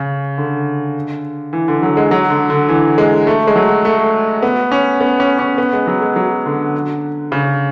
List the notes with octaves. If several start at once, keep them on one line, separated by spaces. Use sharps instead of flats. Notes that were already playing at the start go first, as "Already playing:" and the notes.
Already playing: C#3
D3
E3
D3
F#3
G#3
F#3
D3
D3
E3
G#3
A3
G#3
F#3
A3
B3
C#4
B3
C#4
C#4
B3
G#3
F#3
G#3
F#3
D3
C#3